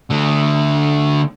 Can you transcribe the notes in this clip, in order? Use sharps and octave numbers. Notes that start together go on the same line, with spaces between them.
D3 A3